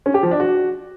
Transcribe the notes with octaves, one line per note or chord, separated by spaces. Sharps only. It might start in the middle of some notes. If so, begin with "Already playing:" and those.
C#4
G4
F3
D4
F#4